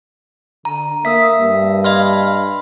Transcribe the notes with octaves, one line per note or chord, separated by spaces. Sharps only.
D3 A#5
A#3 E5 D#6 E6 B6
G2
D#5 F5 B5 C6 F6